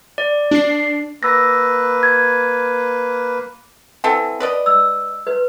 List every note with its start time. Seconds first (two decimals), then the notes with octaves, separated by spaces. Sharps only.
0.18 D5
0.51 D4 C7
1.23 A#3 B4 E6 A#6
2.03 G#6
4.04 E3 C4 A4 F#5
4.40 B4 D5 D#5
4.66 E6
5.27 B4